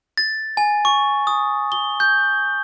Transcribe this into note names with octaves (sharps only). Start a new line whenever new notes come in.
A6
G#5
C#6
D#6
G7
G6